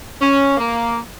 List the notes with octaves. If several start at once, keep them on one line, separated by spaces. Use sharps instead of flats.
C#4
A#3